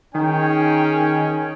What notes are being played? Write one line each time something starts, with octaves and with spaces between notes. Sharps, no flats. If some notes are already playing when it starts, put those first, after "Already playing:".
D#3 C#4 G#4 G5